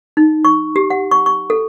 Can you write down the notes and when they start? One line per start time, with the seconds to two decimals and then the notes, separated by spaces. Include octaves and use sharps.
0.17 D#4
0.45 C#6
0.76 G4
0.90 F#5
1.11 C#6
1.26 C#6
1.50 A4